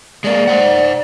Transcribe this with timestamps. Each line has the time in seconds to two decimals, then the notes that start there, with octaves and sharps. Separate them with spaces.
0.24 G#3 A#3 D5
0.47 C5 F#5